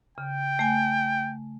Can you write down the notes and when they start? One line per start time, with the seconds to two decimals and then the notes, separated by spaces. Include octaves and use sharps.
0.18 C#3 G5
0.59 A3 G#5